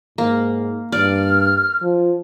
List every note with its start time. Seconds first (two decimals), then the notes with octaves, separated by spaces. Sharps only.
0.18 G#2 A#3
0.92 G2 D5 F6
1.82 F3